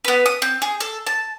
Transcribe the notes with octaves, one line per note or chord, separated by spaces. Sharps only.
B3 B4
D#6
C4
G#4
A4
A5